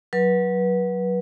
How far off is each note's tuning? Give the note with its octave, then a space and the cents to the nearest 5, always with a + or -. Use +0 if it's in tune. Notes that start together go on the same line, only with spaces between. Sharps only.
F#3 +0 B4 -25